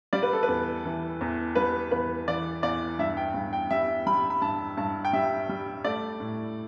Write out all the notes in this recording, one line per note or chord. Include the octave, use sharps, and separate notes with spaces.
G3 D5
B4
A4
B4
E2
E3
E2
G3 B4
E2 B4
E3 D5
E2 D5
G2 E5
G5
G2
G5
G3 E5
G3 B5
B5
G2 A5
G2 A5
G5
G3 E5
G3
A3 D5
A2